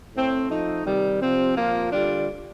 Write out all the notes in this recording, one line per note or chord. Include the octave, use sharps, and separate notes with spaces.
A2 A3 C4
F3 A3 D#4
C3 D#3 G3
C3 F3 C4
A#2 F3 A#3 F4
D3 G3 D4 F4